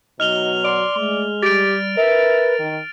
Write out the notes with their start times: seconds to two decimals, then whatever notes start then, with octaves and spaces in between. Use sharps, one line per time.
0.20 B2 F#3 D#4 F6 F7 G7
0.65 D5 C6
0.97 G#3 A3
1.43 G3 G4 A6 D7
1.97 A#4 B4 E5
2.59 D#3